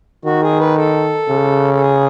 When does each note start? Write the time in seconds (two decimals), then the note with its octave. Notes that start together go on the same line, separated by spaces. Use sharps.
0.25 D#3 F#4
0.43 G#4
0.59 B4
0.77 A4
1.29 C#3
1.74 A4
1.80 G#4